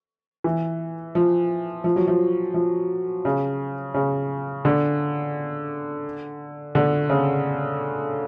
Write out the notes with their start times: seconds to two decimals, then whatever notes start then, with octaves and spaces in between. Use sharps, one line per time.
0.44 E3
1.15 F3
1.84 F3
1.96 F#3
2.07 F3
2.54 F3
3.25 C#3
3.94 C#3
4.65 D3
6.75 D3
7.10 C#3